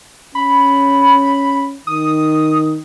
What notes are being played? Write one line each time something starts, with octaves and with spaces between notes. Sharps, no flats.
C#4 B5
D#3 D#6